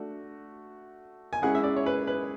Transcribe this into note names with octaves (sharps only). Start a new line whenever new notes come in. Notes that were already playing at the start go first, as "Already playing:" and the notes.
Already playing: A3 D4 F#4
G#5
G#3 C#4 E4 G#4 F#5
E5
D5
C#5
B4
B4